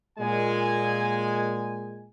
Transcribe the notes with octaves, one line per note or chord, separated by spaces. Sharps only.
A#2 G#3 G#5